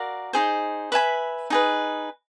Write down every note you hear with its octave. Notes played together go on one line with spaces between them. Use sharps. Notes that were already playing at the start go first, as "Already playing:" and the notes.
Already playing: F#4 A#4 D5 F5
D#4 G#4 C5
B4 E5 G#5 B5
D#4 G#4 B4